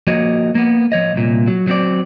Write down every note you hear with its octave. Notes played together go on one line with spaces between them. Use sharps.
F3 A#3 F#4 C#5 D#5
A#3 B3
F3 C#5 D#5
C2 A#2
F#3
F#3 C4 D5